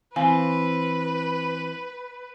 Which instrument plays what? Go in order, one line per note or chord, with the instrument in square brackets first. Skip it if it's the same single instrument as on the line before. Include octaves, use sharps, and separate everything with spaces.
[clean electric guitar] E3 C4 [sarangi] B4 [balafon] F5 G#5